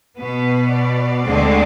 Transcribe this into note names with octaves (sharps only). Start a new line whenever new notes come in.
B2 B3 B4
D5
D2 D3 G#3 C4